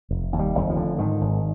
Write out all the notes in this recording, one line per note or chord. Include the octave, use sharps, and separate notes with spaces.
F1
D#2
G3
F1
F3
D3
G#2 D#3
G#1